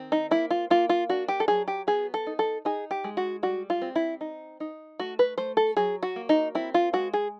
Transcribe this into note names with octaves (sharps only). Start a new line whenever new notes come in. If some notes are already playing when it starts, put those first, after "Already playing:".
Already playing: D#3 C4
D#4
A#3 E4
F4
A#3 F4
F4
D4 F#4
G4
A4
F#3 G#4
G4
B3 G#4
A4
D#4
A4
D#4 G#4
G4
G#3
F#4
G3 F#4
F4
C4
E4
D#4
D#4
A3 F#4
B4
A3 C5
A4
F#3 G#4
F#4
A#3
D#4
C4 E4
F4
G#3 F#4
G#4